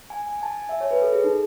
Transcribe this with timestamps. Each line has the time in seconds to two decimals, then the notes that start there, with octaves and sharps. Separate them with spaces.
0.10 G#5
0.27 G#5
0.38 G#5
0.43 A5
0.59 G#5
0.69 E5
0.81 C#5
0.91 B4
1.02 A4
1.13 G#4
1.24 D#4